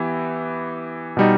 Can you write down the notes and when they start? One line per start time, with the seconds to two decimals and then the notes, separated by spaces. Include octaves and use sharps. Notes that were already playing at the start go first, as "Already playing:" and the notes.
Already playing: E3 B3 E4 G4
1.17 B2 G3 D#4